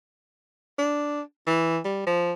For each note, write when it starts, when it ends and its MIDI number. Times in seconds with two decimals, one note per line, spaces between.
0.79 1.21 62
1.47 1.78 52
1.85 2.06 55
2.07 2.33 53